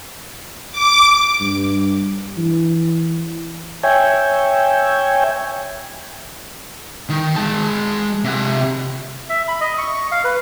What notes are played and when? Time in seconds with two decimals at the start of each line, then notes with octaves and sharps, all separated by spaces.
0.72 D6
1.41 G2
2.38 E3
3.83 C#5 E5 G5 G#5
7.09 D#3
7.36 G#3 A5
8.24 C3 F#5
9.29 E5
9.48 B5
9.61 D#5
9.78 C#6
10.12 F5
10.24 B4